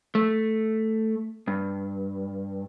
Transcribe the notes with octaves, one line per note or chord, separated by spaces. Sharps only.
A3
G2